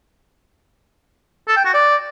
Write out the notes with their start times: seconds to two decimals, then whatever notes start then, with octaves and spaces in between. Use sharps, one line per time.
1.48 A4
1.56 G5
1.65 F#4
1.74 D5